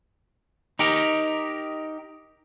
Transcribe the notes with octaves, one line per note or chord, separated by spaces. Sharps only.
D#4 G4 A#4